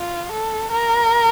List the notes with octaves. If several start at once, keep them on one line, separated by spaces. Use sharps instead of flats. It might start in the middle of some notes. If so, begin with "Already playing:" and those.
Already playing: F4
A4
A#4